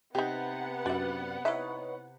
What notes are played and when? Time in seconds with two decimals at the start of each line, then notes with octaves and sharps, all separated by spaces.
0.15 C3 B3 D#4 G4 F#5
0.86 F#2 D4 D5 E5 F#6
1.45 D#4 E4 B4 C#5 E5